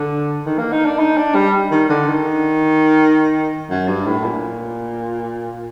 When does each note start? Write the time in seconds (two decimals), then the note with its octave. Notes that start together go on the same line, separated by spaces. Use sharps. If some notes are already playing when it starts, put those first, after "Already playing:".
Already playing: D3
0.46 D#3
0.58 A#3
0.72 D#4
0.86 D4
0.99 D#4
1.17 D4
1.35 G3
1.71 D#3
1.89 D3
2.08 D#3
3.70 F#2
3.88 G2
4.06 A2
4.24 A#2